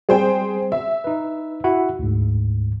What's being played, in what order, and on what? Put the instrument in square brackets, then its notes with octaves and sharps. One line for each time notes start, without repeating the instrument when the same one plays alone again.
[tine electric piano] G3 C4 [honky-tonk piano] G#4 C5 G5
[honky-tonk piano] E5
[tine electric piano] D#4 B4
E4 F#4 F#5
D2 G#2